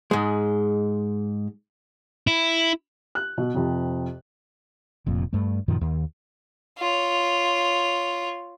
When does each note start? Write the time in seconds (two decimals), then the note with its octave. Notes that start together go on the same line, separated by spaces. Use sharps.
0.11 G#2 G#3
2.27 E4
3.15 F#6
3.38 B2
3.54 F2 C3
5.06 F1 F2 A#2
5.33 G2 A3
5.68 F#2 A#2 D#3 F3
5.81 D#2
6.79 F4 C#5